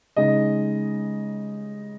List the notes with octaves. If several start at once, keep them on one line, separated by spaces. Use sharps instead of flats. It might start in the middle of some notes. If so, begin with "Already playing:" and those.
C#3 G#3 D#4 D#5